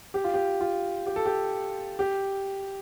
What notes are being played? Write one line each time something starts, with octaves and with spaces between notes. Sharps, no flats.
G4
F4
G4
F4
G4
A4
G4
G4